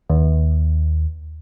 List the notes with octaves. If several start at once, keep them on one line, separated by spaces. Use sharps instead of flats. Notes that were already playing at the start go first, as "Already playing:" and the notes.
D#2